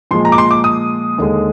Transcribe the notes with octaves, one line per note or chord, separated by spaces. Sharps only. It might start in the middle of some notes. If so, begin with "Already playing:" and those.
A#2 F3 G#3 C6
A#5
D6
C6
D6
D#6
D#2 D3 G#3